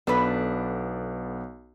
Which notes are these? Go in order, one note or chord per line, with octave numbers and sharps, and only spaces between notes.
B1 B3 D4 A4 B4